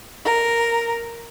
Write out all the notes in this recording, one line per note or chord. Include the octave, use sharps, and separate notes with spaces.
A#4